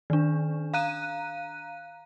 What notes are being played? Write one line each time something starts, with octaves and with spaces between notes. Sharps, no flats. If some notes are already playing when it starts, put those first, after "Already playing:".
D#3 D4
F5 A#5 F#6 D#7